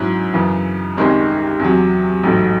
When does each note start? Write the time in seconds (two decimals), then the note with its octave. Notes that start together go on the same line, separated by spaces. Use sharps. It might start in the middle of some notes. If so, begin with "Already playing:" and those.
Already playing: G#2 F#3 C#4 E4
0.34 F#2 C#3 E3
0.97 C2 C3 D#3 G#3 C#4
1.60 E2 C3 F#3
2.23 A1 G#2 F#3 A3